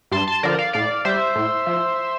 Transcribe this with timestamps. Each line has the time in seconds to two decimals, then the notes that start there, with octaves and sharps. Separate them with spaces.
0.12 G2 A5 C6
0.28 A5 C6
0.43 D3 F3 A#4 D5
0.59 D5 F5
0.73 A2 D5 F5
1.05 G3 C5 E5
1.35 A2
1.67 F3